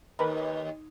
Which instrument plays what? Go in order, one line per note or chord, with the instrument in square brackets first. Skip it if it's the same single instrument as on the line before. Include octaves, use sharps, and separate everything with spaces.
[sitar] D#2 [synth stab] A#4 B4